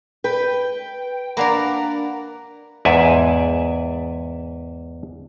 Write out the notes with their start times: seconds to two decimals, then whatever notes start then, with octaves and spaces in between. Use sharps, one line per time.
0.24 B4 G5
1.37 A#3 D4 A#4 D5 F#5 A#5 B5
2.85 E2 G#2 D5 E5 G#5 A5